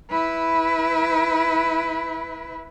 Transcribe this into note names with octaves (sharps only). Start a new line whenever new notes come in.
E4 B4